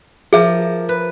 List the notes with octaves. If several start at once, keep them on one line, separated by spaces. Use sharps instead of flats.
F3 G#4 A#4 E5
B4